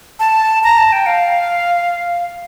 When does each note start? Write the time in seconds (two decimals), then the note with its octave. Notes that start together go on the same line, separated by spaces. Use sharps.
0.19 A5
0.64 A#5
0.78 A5
0.92 G5
1.06 F5